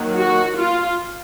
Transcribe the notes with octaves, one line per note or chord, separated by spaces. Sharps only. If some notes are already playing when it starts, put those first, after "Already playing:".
Already playing: D#3 F#3 A#3
F#4
F4